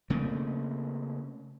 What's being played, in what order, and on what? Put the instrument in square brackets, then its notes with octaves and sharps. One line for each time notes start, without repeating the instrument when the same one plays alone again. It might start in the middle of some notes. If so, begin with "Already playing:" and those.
[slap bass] C#3 A3 A#3 C4